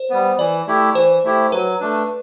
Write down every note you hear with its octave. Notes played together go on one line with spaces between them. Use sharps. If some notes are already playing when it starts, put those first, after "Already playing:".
Already playing: C5
G3 B3
E3 D5
A3 E4 G4
E3 C5
A3 E4 G4
F#3 B4
A3 D4